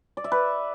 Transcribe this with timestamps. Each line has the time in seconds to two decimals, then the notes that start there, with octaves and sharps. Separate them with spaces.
0.17 D5
0.24 E5
0.32 B4